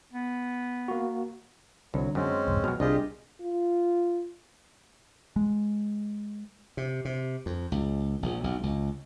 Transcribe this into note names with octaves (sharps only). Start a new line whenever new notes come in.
B3
A#3 F#4
C2 D3 F#3
F#2 G#3 C4 C#4
C2 F2 G#2
B2 F#3 F6
C2 D4 F4 G4 G#4 D#5
F4
G#3
C3
C3
F2
C#2
A#1
B1
C#2